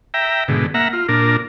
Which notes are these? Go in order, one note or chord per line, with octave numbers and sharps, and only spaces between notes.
E5 G5 A#5
G#2 B2 D3
A#3 E5 F#5 A#5
F4
A#2 D4 A#4